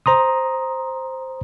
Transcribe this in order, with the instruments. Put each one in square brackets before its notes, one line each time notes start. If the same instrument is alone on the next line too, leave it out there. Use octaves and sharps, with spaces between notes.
[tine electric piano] C5 A#5 C6 D#6